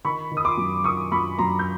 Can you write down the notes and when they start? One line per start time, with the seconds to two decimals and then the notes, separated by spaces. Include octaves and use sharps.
0.05 D#3 B5 C#6
0.31 D#3
0.37 D#6
0.45 C6 D6
0.58 F#2
0.84 D#3 C#6 D#6
1.12 F#2 B5 C#6
1.38 F#2 A#5 C6
1.59 G6